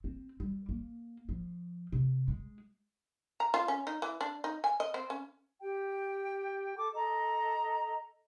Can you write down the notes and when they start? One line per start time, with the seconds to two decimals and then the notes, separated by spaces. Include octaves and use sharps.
0.04 C4
0.40 G3
0.69 A#3
1.29 F3
1.92 C3
2.28 G#3
3.40 A#5
3.54 F4
3.68 C#4
3.87 D#4
4.02 E3
4.21 D4
4.44 D#4
4.64 G#5
4.80 D#5
4.94 C4
5.10 C#4
5.61 G4 G5
6.76 A4 D6
6.94 A4 D#5 A#5